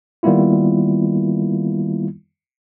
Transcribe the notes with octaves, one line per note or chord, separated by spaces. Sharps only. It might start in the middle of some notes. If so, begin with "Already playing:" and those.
D#3 G3 A#3 B3 E4 F4